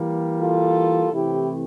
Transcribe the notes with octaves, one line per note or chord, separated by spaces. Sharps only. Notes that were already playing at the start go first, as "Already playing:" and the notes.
Already playing: E3 G3 A#3
F4 A4
C3 E3 A3 C4 E4 G4